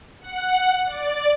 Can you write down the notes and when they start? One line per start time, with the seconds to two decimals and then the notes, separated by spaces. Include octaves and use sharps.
0.20 F#5
0.85 D5